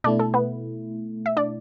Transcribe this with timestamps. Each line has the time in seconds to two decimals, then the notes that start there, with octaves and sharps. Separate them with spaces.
0.04 B2 A3 D4 E4 D5
0.19 A4
0.34 B3 B4
1.26 E5
1.37 D4 D5